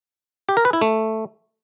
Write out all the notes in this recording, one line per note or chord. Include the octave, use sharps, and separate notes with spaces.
G4
A#4
B4
E4
A3